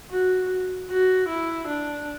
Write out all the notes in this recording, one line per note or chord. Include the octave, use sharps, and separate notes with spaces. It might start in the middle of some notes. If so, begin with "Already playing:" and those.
F#4
F#4
E4
D4